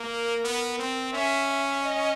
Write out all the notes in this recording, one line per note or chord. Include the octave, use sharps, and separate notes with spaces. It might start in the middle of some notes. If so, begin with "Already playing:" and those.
Already playing: A#3 A#4
B3
C4
C#4 E5
E5
D#5